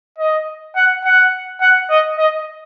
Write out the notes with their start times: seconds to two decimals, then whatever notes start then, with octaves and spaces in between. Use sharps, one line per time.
0.18 D#5
0.76 F#5
1.05 F#5
1.61 F#5
1.90 D#5
2.18 D#5